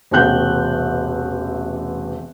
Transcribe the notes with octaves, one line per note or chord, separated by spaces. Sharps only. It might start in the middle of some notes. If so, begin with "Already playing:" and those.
E1 A1 C3 G5 F#6 G6